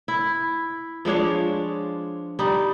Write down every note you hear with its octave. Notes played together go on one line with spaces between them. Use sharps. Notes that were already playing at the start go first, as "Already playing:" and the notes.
E4
F3 G#3 D4 C#5
G3 D#4